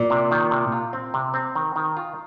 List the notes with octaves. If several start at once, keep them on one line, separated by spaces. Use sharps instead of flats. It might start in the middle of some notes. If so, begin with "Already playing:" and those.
Already playing: A#2
C3
D#3
C3
F4
C4
C3
C4
D#3
D#3
F4